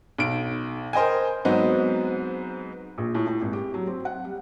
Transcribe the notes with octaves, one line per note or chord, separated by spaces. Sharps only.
B1 D7
A#4 C5 D#5 G5 G#5
G#2 F#3 B3 C4 D#4
A#1
A2
A2
G#1
G4
F#3
C4
F#5
G3